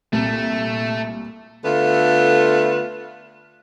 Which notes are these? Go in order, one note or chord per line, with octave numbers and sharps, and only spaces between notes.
C2 A#2 A3
D3 A3 B3 F4